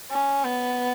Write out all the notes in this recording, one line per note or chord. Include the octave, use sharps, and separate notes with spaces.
C#4
B3